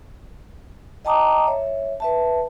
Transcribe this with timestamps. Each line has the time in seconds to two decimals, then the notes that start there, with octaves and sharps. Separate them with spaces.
1.05 D#5 G5 A5 A#5 D6 D#6
1.46 C#5 E5
2.00 B4 E5 A5